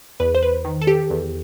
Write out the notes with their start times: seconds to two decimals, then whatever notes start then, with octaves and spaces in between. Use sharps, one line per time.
0.20 E2 B4
0.35 C5
0.43 B4
0.65 D#3
0.81 A4
0.87 G4
1.10 E2